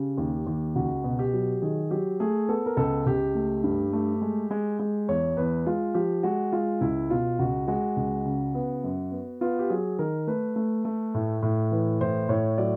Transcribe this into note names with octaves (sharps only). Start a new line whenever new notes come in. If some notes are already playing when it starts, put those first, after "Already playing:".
Already playing: C#3 G4
D#2
D#2
C#2 F#4
B2
G4
F#3
D#3 G#4
F#3 G4
A3 G#4
B3 A4
A#4
C#2 A4
C#2 G4
A3
G2
A3
G#3
G#3
G#3
E2 C#5
E2 B4
G#3 F4
F3 G4
G#3 F#4
G#3 F4
C#2 E4
B2 F4
C#2 F#4
G#3 F#4
C#2
C#3
B3
F#2
B3
B3 F4
G4
F#3 G#4
D#3 A#4
A3 B4
A3
A3
A2
A2
E3
A2 C5
A2 C#5
F#3 D5